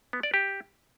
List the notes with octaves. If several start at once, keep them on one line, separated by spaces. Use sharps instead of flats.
B3
D5
G4